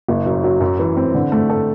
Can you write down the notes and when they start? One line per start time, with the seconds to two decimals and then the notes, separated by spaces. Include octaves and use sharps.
0.08 F#1
0.26 F#2
0.44 F#3
0.60 F#2
0.79 E3
0.97 C4
1.14 D3
1.32 A3
1.50 A4